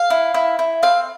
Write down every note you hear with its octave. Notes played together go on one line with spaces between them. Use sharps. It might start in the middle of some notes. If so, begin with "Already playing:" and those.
Already playing: F5
E4
E4
E4
C4 F5